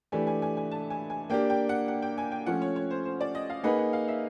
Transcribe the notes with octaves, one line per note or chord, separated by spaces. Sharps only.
E3 A3 D4 G4 G#5
G#5
G#5
G#5
A5
G#5
G#5
A#3 D4 G4 G5
G5
F#5
F#5
G5
G#5
G5
F3 A3 C#4 F#5
C#5
C#5
C5
C5
D5
D#5
F5
A#3 D#4 G#4 B4 F#5
F#5
F5
E5